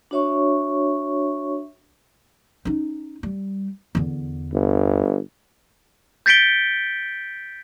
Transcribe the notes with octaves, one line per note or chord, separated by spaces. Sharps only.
D4 F#4 C#5 E5 C#6
C#4 D#4
G3
E2 D3
G1
G6 A6 B6 C#7 D7 G7